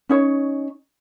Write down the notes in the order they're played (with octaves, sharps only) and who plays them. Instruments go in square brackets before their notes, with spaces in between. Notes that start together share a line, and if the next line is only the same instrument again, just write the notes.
[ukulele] C#4 D#4 C#5